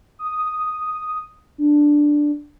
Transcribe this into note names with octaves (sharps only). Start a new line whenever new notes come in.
D#6
D4